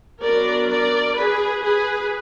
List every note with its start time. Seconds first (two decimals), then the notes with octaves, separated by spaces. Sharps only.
0.24 F#3 B3 D4 A#4 D5
0.70 A#4 D5
1.17 G#4 B4
1.64 G#4 B4